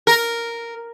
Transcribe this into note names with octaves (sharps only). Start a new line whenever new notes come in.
A#4